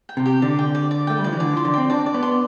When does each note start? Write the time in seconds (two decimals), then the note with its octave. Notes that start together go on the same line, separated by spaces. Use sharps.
0.09 G5
0.17 C3
0.26 G4
0.42 D3 D5
0.59 G5
0.75 D5
0.91 D5
1.07 A3 G5
1.18 G3
1.24 F3 D5
1.33 E3
1.40 D3 D5
1.53 F3 C6
1.65 D3
1.74 C4 G5
1.90 D4 D5
2.06 D5
2.14 B3
2.23 C6